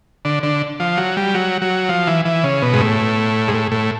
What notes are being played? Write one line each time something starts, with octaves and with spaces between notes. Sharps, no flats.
D3
D3
F3
F#3
G3
F#3
F#3
F3
E3
E3
C#3
B2
G#2
A2
G#2
A2
A2